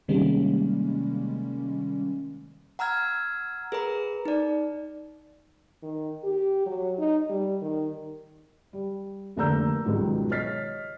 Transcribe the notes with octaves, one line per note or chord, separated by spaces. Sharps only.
C3 D#3 G3 G#3 A#3 C#4
F#5 A#5 E6 F6 G#6
G#4 A#4 B4 A#5
D#4 D5
D#3
G4
F#3
D#4
G3
D#3
G3
F1 D3 A#3 A#5 E6 G6
C#2 G#2 B2 D#3 F#3 G3
C#5 D#5 F6 A6 B6 C7